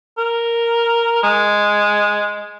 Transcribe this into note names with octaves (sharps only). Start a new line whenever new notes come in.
A#4
G#3